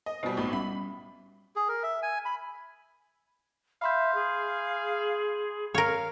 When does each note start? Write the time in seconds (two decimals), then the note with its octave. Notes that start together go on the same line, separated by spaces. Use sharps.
0.06 D#5
0.23 B2 G3 B3 F#4 D#5
0.37 B1 A2 B5
0.53 G3 B5
1.56 G#4
1.68 A#4
1.83 E5
2.03 G#5
2.25 B5
3.82 E5 F5 B5 C6 G6
4.14 G#4
5.75 A#4 C#5 F5